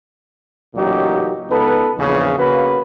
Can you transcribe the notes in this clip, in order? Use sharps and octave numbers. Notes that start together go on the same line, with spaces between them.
A1 A#2 C#3 F#3 D#4 G4
C#2 B3 D#4 A4 B4
A#1 E2 C#3
C#3 A#3 F#4 B4